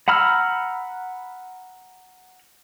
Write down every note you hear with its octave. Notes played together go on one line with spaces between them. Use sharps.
F#5 A#5 B5 E6 F6